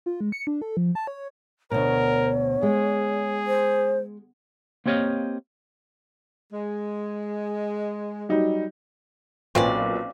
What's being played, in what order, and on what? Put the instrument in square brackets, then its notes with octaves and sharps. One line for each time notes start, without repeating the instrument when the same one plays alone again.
[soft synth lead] F4
G#3
C#7
D4
A4
F3
A5
C#5
[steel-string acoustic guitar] D2 B2 [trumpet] A#4 [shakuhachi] C#5
[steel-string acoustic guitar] G#3 [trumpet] G#4
[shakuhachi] C5
[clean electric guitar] A#3 C4 G4 C#5 D#5 F5
[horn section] G#3
[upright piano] F#3 G3 D#4
[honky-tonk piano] B1 A#2 B4 [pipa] C4 C#4 D5